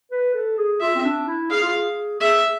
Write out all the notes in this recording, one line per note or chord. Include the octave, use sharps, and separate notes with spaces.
B4
A4
G#4
F4 E5
C4
D4
E4
G#4 F5
F4
G#4
G#4 E5